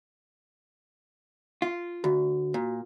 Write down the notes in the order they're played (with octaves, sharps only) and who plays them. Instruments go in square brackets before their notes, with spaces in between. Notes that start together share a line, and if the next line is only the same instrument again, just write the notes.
[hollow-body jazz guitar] F4
[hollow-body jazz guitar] D2 [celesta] F#4
[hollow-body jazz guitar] A#2